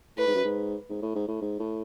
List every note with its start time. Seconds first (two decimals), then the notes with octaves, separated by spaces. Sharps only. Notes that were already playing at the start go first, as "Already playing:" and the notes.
0.17 A2 B4
0.27 G#2
0.35 F#2
0.44 G#2
0.89 G#2
1.02 A2
1.15 G#2
1.28 A2
1.41 G#2
1.59 A2